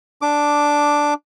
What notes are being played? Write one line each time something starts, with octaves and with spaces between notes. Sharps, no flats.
D4 D6